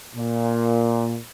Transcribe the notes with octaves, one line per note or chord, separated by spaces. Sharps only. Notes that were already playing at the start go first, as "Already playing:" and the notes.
A#2